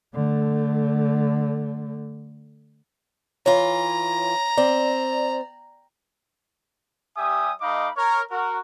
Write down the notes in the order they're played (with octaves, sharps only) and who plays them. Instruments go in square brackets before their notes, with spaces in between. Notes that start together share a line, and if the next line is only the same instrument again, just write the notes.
[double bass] D3 A3
[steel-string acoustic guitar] E3 F4 [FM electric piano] C#5 [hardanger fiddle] A#5
[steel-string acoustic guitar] C4 [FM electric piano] D5
[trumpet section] G3 G4 E5 G#5 D#6
A3 D#4 D#5 F5 B5 D6
A#4 C#5
F#4 A#4